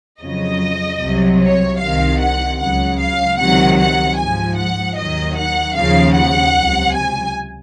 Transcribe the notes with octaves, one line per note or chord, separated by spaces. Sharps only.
F2 C#3 F#3 D#5
C2 C3 F#3
C#5
C2 C3 D#3 F5
F#5
C#2 C#3 F#3 F#5
F5
C#2 C3 D#3 F#3 F#5
F#5
G#2 F3 G#5
F#5
D#2 D#3 F#3 D#5
F#5
D#2 C#3 F3 F5
F#5
C#2 C3 F#3
G#5